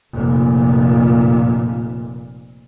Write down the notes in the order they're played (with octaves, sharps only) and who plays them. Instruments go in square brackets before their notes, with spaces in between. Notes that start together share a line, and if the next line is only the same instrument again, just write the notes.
[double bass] F1 A#2